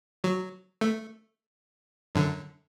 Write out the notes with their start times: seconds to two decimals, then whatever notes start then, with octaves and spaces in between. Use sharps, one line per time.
0.24 F#3
0.81 A3
2.15 F#2 D3